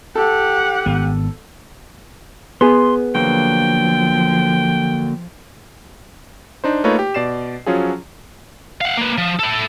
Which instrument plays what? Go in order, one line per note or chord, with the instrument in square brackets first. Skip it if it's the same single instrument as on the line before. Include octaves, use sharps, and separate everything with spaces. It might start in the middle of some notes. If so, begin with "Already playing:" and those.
[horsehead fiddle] G4 F#5 [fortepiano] A4
[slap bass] G#1 B3
[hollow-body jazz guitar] B3 G#4 [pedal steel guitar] C6
[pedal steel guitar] D3 F#3 A#3 [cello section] F3 [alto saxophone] G5
[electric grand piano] D4 D#4 C5
A3 A#3 D#4 F4 B4 C#5
G4
B2 D5 C7 E7
F3 F#3 C#4 F4 G#4
[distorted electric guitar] F5 F#5
A#3 B4
F3
E4 A4